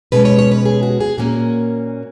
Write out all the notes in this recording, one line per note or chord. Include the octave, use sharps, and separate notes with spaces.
B2 G#3 C#4 B4
C#5
C#5
B4
G#4
F#4
G#4
A#2 A#3 C#4 F#4